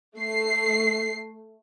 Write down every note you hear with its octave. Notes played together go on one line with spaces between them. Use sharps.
A3 C7